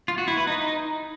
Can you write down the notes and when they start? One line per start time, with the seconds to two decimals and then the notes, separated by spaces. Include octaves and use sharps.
0.08 F4
0.18 F#4
0.28 E4
0.37 B4
0.47 D#4